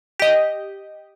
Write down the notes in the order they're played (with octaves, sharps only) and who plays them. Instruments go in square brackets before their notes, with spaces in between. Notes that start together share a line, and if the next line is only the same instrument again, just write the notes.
[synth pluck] G4 D#5